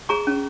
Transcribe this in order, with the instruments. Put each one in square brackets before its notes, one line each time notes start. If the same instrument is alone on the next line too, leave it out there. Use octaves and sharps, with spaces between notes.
[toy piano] G#4 A#5 C#6
C#4